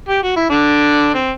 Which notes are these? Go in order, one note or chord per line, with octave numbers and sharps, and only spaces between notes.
G4
F#4
E4
D3 D4
C4